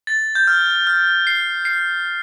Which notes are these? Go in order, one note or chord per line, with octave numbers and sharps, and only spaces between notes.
A6
G6
F6
F6
C7
C7